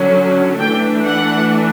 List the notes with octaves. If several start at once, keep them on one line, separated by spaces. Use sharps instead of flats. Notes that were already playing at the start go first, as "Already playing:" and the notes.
Already playing: D3 F#3 C#4
E3 A3 D4 G5
F#5